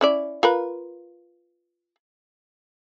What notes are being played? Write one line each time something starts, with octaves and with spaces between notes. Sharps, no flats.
C#4 E4 D5
F4 A#4 B4